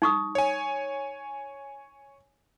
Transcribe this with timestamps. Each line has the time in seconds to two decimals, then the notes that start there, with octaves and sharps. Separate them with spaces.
0.02 D#4 C#6 D#6
0.35 C#5 G#5